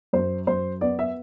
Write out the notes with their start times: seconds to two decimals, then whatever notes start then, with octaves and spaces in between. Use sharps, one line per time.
0.13 F#2 C5
0.47 F#2 C5
0.81 B3 D5
0.99 E5